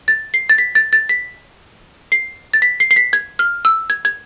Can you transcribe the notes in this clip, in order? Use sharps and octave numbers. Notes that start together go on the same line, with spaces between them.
A6
C7
A6
B6
A6
A6
B6
C7
A6
B6
C7
C7
B6
G#6
F6
E6
G#6
G#6